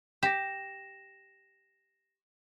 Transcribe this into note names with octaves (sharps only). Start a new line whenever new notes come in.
G4 A#6 E7